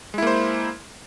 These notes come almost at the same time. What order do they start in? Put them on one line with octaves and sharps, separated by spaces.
G#3 E4 A#3 C5